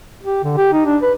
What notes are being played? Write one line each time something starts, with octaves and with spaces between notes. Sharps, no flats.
G4
D3
G4
D#4
D4
B4